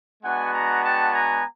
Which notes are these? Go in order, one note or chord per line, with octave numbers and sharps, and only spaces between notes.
G#3 B3 D4 F#4 F#5 G#5
G#5 A#5
G5 A5
G#5 A#5